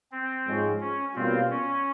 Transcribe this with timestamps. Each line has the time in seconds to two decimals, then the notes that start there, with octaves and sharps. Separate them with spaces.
0.12 C4
0.46 G#2 F3 G#3 C#4
0.81 C#4
1.15 B2 G3 A#3 C4 C#4 F4
1.51 C#4